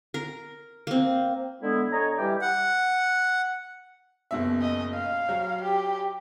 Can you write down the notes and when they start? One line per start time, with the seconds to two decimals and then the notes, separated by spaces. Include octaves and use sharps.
0.14 A#4
0.87 A#3 C4
1.61 D3 G#3 B3 E4
1.91 D3 C#5 D#5 G#5 A#5
2.18 E3 G3 G4
2.42 F#5
4.31 F#1 B2 E5
4.62 D#5
4.94 F5
5.29 F#3
5.63 G4